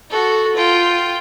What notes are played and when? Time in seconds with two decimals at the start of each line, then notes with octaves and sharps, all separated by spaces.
0.10 F#4 A4
0.56 F4 G5